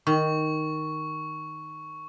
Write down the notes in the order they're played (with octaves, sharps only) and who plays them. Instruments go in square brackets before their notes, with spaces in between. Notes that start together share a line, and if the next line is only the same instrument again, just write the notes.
[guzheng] D#3 [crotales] C#6